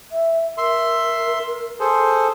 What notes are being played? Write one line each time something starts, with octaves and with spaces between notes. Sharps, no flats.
E5
A#4 E5 C6
G#4 A4 C5